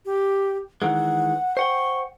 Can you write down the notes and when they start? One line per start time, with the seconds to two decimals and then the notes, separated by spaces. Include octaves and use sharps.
0.06 G4
0.82 D#3 E3 G#3 F#5
1.57 C5 F#5 G5 C#6